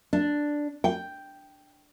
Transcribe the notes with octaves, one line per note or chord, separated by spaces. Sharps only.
D4
G5